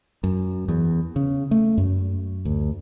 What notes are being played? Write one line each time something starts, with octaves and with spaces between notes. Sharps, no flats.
F#2
E2
C#3
A3
F#2
D2